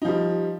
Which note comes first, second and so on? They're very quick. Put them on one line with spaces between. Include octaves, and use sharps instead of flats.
D#4 F3 G3